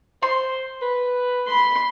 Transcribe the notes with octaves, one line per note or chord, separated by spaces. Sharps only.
C5 C6
B4
B5 C6